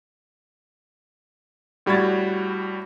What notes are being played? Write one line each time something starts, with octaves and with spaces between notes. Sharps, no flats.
A2 G3 F#4 B5 G#6 A6